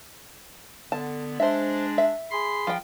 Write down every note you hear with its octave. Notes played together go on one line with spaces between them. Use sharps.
D3 B3 A5
G#3 D4 C5 E5
E5
G#4 B5 C6
F3 G5